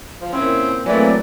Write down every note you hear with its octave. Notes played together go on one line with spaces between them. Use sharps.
F3
A#2 C4 C#4 E4
E3 F#3 A3 A#3 C4 D5 G#5